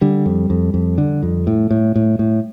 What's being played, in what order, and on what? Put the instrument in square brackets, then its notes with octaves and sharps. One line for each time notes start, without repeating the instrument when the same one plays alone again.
[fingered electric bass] D3 G3
F2
F2
F2
D3
F2
A2
A2
A2
A2